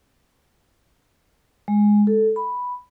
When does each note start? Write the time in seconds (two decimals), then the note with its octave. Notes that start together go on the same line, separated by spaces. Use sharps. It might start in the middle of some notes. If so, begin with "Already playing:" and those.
1.68 G#3
2.07 A4
2.36 B5